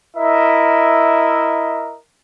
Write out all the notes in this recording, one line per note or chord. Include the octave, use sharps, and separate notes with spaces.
E4 A#4 D#5 E5